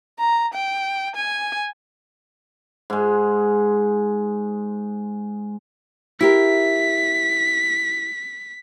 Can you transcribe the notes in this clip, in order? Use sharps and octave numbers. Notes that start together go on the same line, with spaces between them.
A#5
G5
G#5
G#2 G#3
E4 G4 A#4 B6